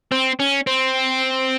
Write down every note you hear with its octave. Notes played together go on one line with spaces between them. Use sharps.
C4
C#4
C4